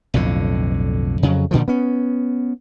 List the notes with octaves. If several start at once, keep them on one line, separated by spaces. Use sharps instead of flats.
B1 F2 A2 D3
F2 C#3 F#3
A#2 D3 D#3 F3
B3 C#4